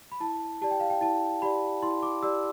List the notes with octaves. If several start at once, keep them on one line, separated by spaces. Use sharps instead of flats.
B5
E4 A5
G4 D5 A5
G5
F5
G5
E4 A5
G4 D5 B5
E4 C6
D6
G4 D5 E6